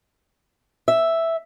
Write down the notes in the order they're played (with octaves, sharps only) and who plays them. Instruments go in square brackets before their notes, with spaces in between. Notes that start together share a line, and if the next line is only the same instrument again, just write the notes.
[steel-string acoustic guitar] E5